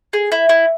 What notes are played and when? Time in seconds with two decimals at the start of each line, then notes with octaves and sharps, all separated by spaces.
0.13 G#4
0.32 E4
0.49 E4